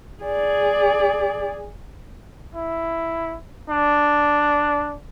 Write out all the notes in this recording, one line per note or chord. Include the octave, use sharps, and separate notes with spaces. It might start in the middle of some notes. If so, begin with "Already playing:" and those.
G#4 D5
E4
D4